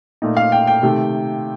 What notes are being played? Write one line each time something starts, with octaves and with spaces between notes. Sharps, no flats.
A#2 A3 D#4
F5
G5
G5
C3 D#3 A3